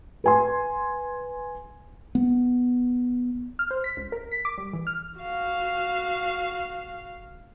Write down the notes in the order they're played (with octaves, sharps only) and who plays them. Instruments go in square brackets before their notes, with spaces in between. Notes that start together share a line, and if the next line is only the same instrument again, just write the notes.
[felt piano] B4 G#5 C6
[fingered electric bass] B3
[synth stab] F6
C5
B6
C#2
A#4
B6
D6
G3
E3
F6
[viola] F#4 F5